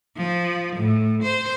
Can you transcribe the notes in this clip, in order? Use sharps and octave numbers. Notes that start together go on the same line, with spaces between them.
F3
A2
C5